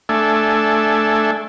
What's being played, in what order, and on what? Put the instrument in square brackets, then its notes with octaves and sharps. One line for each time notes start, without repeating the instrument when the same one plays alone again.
[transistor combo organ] A3 D4 A4 E5 G#5